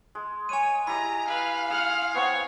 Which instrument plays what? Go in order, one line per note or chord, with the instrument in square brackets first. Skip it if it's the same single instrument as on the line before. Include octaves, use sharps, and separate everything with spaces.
[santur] G#3
[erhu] C#5 [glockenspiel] G#5 D#7
[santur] E4 G4 D#5 [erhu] A#5 [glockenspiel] B5
[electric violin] B4 [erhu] F5
[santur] G#4 C6 [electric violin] F#5 F6
[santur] B3 C4 [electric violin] C#5 C#6